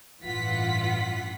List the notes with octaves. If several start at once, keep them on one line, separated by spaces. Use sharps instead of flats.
A1 G2 E3 F4 F#5 B6